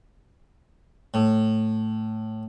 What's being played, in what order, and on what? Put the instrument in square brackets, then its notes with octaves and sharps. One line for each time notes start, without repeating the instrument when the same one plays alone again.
[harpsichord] A2